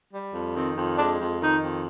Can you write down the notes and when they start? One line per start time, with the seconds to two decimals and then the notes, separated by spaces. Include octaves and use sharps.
0.12 G3
0.34 F2
0.55 D#3 C4
0.76 F2
0.97 G#3 D4
1.19 F2
1.40 D#3 D#4
1.62 F2